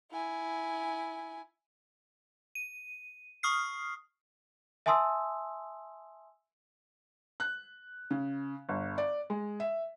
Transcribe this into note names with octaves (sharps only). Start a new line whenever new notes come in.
E4 G#5
D#7
C#6 D#6 F6 C7
E5 G#5 A5 C6 D#6 E6
F#6
C#3
G1
D5
G#3
E5